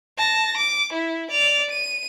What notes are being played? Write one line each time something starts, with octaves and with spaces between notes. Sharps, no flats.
A5 A#6
D6
E4
D5 F7
D#7